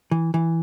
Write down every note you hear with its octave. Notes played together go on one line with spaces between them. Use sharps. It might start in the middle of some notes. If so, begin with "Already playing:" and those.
E3
E3